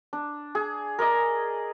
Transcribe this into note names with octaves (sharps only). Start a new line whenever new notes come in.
D4
G#4
A#4 D5 D#5